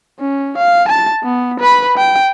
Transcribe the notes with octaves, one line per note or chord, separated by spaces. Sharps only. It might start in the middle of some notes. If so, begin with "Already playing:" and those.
C#4
F5
A5 A6
B3
B4 B5
G5